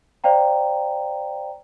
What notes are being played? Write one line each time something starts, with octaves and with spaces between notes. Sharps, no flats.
C5 D5 F5 G5 A#5